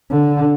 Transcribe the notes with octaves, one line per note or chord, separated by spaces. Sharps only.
D3